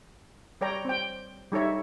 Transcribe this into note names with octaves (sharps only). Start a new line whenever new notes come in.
G3 C#5 D5 G5 A#5
C4 G5
G3 D#4 A4 C#5 E5